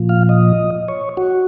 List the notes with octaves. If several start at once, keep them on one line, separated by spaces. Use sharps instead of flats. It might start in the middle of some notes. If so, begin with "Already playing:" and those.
Already playing: A#2 F3
F5
D#5
C#5
F#4